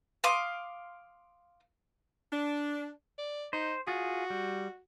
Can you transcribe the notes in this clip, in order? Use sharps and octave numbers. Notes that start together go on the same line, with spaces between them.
F5 C6 D6 D#6
D4
D5
D#4 C5
F4 F#4 G#4
G3